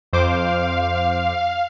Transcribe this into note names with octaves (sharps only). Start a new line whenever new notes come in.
F2 C5 F5 D6